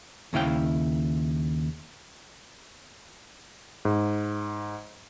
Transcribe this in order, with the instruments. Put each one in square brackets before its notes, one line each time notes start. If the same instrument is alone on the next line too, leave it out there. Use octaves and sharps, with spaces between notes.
[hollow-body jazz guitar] D#2 C#3 E4 F5 G5
[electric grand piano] G#2